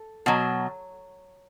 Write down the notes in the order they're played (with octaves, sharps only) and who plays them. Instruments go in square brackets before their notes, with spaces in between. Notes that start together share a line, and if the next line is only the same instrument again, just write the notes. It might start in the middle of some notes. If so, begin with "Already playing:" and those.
Already playing: [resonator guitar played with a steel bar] A4
B2 F#3